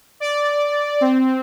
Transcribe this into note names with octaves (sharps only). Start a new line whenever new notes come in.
D5
C4